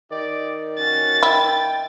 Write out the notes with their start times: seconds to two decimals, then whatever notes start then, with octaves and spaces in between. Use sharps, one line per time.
0.12 D#3 D#4 G4 D5
0.79 C#4 F#4 A6
1.23 E4 G5